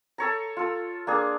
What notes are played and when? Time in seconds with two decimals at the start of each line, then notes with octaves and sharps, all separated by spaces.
0.18 A4 C#5 A#5
0.57 F4 A4
1.07 A#3 D4 G#4